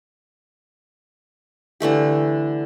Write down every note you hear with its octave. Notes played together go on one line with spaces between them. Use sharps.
D3 E3 A3 G4